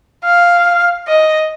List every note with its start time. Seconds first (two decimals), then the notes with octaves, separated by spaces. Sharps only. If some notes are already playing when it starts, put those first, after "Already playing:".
0.24 F5
1.08 D#5